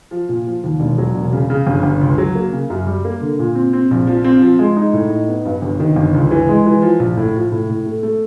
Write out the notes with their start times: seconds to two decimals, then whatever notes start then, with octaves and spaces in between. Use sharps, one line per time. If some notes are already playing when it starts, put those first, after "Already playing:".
0.11 F3
0.29 A#2
0.47 F3
0.64 D#2
0.80 E1
0.98 F#3
1.15 E1
1.33 C#3
1.50 C#3
1.67 G1
1.83 G1
2.01 C#2
2.18 F#3
2.35 A#3
2.52 C#3
2.70 F#2
2.86 G3
3.05 A#3
3.21 D3
3.39 A#2
3.55 C4
3.73 C4
3.91 A#1
4.07 F3
4.24 C4
4.42 F3
4.59 G#3
4.77 D#4
4.93 A2
5.10 D#4
5.28 B3
5.45 G2
5.62 G1
5.80 D#3
5.96 G1
6.14 C#2
6.31 E3
6.49 G#3
6.66 E3
6.82 F3
7.00 A#1
7.17 A2
7.35 F3
7.52 A2
7.69 A2
7.86 A3
8.03 A3